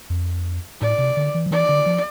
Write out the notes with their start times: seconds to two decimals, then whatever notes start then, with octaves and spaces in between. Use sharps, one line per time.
0.10 F2
0.81 A2 D5
0.98 C3
1.17 D3
1.34 E3
1.46 F3
1.51 E3 D5
1.69 D3
1.86 F3